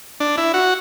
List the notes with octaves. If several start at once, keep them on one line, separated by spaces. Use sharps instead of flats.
D4
E4
F#4